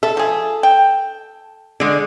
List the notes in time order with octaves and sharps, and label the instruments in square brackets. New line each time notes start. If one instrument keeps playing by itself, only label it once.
[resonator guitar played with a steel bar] A4 [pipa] E5
[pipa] F3 G#4
G5
[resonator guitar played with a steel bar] D3 G#3